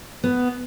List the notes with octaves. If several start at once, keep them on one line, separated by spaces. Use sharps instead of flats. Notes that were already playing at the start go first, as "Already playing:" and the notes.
B3